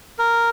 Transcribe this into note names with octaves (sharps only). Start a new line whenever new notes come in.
A#4